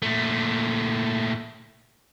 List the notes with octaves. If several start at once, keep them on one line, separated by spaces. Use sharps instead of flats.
A#2 A3